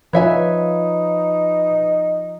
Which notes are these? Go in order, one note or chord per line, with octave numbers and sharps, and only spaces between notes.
F3 D#4 F4 B4 C#5 E5 G#5